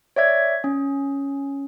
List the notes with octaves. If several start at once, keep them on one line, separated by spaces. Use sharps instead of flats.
C#5 D5 E5 G#6
C#4